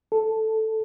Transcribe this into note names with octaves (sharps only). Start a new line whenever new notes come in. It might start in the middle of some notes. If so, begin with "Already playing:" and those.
A4